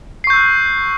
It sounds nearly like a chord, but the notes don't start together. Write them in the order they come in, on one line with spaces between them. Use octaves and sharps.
C7 C#6 G6 E6 F#6